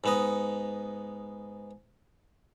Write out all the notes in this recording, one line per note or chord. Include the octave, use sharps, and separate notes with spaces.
G#2 B3 D#5